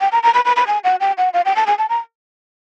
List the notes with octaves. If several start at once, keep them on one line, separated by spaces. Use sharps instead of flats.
G5
A#5
A#5
B5
B5
B5
G#5
F#5
G5
F#5
F5
G5
A5
G#5
A5
A#5